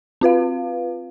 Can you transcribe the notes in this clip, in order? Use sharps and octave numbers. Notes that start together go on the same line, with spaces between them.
C4 F4 B4 F5